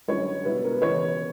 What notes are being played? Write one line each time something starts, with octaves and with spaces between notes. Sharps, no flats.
F#2 D3 G3 C#4 C#5
C#2 B2 G3 B3 E4 B4
A#4
B4
C#3 E3 B3 C#5